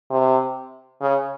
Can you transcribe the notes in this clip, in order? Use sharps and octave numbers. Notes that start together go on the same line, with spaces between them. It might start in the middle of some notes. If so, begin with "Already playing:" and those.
C3
C#3